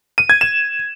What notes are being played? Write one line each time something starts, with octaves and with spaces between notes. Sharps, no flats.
D#7
G#6
E7